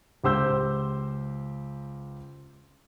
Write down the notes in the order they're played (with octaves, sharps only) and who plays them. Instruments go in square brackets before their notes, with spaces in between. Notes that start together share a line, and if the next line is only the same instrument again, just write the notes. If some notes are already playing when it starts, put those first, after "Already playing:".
[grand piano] C#2 G4 C5 E6 G6